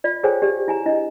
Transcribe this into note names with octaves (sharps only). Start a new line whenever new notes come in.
F4 D5
G#4 A4 C5 C#5 G5 G#5
G4 D5
E4 G#5 A#5
D4 E4 D#5